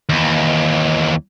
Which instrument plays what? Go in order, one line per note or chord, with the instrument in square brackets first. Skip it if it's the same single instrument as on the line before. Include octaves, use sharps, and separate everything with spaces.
[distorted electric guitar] D#2 E3